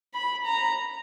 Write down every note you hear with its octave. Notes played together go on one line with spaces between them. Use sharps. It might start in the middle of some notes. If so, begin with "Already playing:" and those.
B5
A#5